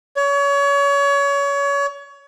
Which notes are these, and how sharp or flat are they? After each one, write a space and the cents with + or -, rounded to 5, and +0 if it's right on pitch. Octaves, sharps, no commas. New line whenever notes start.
C#5 +30